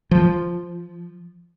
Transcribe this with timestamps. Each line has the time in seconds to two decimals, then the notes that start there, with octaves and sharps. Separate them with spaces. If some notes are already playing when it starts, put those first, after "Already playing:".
0.11 F3